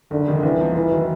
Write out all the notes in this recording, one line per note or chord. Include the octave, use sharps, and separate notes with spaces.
F#1 D3
F2 C3 D#3 G#3
C2 E3
C3 F3 A#3 D#4
F1 E3
D#3 F#3